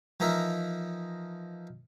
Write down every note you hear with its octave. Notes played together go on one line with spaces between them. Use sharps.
E3 F3 D#4 A#4 E5